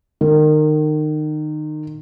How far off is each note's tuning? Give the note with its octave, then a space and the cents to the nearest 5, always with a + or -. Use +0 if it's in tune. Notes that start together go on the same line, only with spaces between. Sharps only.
D#3 -25